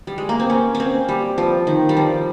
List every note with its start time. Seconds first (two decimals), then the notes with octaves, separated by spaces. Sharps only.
0.07 G3
0.18 G#3
0.29 A#3
0.40 C4
0.50 C#4
0.75 C#4
0.80 C4
1.09 G3
1.38 F3
1.67 D#3
1.89 G3
1.97 F3